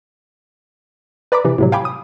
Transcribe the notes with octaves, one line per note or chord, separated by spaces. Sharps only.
B4 D5 A#5 B5 D6
C3 E3
A2 C3 F#3
F5 G5 G#5 B5 D6
D#6